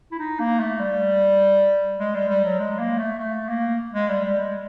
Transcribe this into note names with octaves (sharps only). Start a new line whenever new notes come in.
E4
D#4
A#3
A3
G3
G#3
G3
G3
F#3
G#3
A#3
A3
A3
A#3
G#3
G3
G3
G#3